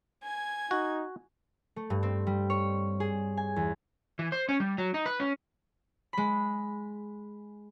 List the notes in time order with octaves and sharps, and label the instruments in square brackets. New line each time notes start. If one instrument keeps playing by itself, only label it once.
[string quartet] G#5 G#6
[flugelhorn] D#4 [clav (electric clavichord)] F#4
[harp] A3
G2
C4
G3
C#5
G#4
G#5
E2
[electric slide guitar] E3
C5
C#4
G3
F#3
D#4
B4
C#4
[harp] G#3 B5